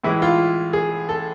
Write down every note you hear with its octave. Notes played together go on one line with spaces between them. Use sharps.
A2 E3 G#3 E4
F4
G#4
A4